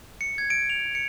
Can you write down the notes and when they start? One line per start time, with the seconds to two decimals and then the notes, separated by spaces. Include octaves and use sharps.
0.21 C#7
0.38 G#6
0.50 D7
0.70 F7
0.95 C#7